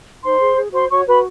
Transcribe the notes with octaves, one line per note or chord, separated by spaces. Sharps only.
D#4 C5 C6
G#4
G#4
F#4 C5 C6
F#4 C#5 C#6
F#4 B4 B5